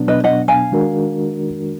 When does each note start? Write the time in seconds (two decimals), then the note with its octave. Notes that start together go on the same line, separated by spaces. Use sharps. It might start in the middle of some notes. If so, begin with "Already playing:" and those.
Already playing: B2 F#3 B3 D4
0.08 B4 D#5
0.24 D#5 F#5
0.48 F5 G#5
0.72 D#3 G#3 D4 F#4 A#4